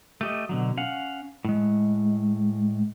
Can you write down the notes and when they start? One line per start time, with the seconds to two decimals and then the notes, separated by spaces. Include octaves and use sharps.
0.21 A3 G4 D#5
0.49 B2 D3 F#3
0.77 C#4 F5 F#5
1.45 A2 G#3